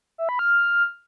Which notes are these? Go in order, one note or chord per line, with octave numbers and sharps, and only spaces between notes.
E5
B5
F6